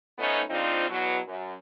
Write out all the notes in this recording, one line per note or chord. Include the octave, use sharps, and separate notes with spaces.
F3 A3 B3 C#4 D#4
C#3 F3 C4 D4 D#4 F4
E2 B2 F#3
F#2